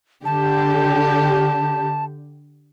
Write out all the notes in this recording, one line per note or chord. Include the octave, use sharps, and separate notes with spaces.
D3 G4 A5